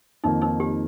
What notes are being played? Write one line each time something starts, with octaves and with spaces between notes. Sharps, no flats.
F2 D#3 A#3 D#4
D#4
G4